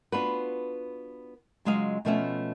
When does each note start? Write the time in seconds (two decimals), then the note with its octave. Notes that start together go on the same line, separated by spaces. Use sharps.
0.12 B3 D4 F4 F#4 B4
1.65 C#3 F#3 G#3 F4 D#5 F5
2.05 B2 F3 A3 B3 C#4 E5